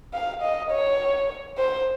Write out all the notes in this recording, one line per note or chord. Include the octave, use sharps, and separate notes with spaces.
F5
D#5
C#5
C5